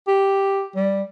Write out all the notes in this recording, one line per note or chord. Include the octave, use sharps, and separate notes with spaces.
G4
G3